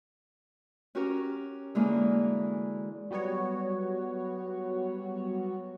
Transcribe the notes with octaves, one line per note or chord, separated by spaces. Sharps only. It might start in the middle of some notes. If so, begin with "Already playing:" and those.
C#4 F#4 G4 A#4
D3 E3 G#3 A#3
F#3 G3 B3 F#4 C#5